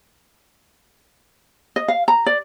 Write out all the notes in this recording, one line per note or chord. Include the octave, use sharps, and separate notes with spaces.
D#5
F5
A#5
D5